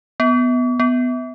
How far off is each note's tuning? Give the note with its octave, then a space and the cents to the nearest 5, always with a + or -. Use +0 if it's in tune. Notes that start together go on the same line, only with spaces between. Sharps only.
B3 +5
B3 +15